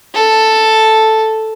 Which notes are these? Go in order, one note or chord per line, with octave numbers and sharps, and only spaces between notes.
A4